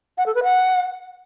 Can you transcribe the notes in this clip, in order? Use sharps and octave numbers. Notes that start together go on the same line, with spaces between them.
F#5
A4
B4
F#5